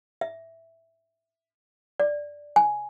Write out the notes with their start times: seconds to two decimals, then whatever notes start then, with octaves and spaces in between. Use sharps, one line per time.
0.21 E5
2.00 D5
2.56 G#5